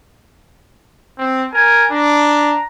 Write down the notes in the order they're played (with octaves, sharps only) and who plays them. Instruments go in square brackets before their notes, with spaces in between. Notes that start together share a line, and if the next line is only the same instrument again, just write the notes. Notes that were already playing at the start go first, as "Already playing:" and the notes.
[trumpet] C4
[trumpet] A#4 [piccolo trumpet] G#5
[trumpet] D4 [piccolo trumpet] A#5